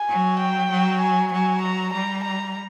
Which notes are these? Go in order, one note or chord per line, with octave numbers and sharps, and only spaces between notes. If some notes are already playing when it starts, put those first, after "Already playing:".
Already playing: G#5
F#3
G5
F#3
G#5
F#3 G#5
A#5
G3 A#5
A#5